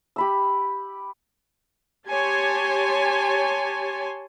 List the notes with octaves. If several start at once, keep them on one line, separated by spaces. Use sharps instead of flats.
G4 B5 E6
G4 C#5 G#5 A5 C6